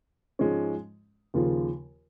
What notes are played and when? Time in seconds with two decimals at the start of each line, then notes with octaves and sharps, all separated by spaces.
0.39 G#2 F3 G#3 C#4
1.34 D#2 C#3 F3 A#3 F4